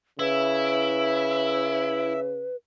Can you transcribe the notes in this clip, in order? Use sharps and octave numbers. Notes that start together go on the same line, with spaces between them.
C#3 E4 B4 E5